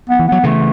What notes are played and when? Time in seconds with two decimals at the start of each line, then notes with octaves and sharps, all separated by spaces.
0.09 B3
0.19 E3
0.28 F#3 B3
0.43 C#3 E3 A3